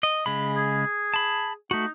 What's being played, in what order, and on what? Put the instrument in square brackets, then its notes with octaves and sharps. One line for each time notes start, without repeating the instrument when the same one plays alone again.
[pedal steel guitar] D#5
C#3 G#3 B5
[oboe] G#4
[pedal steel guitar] A5 B5
[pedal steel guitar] A3 F#4 [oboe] D#4